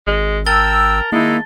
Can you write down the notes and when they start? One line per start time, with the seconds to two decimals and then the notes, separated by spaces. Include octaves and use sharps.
0.07 G#1 G#3
0.46 A#4 G5 A5 E6 A6 G7
1.12 D#3 G#3 A#3 D#4 E4